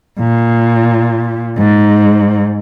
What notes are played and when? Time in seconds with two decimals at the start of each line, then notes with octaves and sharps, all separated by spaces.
0.20 A#2
1.58 G#2